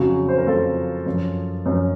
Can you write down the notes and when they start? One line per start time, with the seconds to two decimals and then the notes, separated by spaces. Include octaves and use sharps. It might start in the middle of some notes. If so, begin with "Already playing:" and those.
Already playing: F2 C#3 F#3 F#4
0.28 C5
0.38 A#4
0.47 F2 C#3 F#3 F4 A4
1.06 F#2 F3
1.66 F#2 F3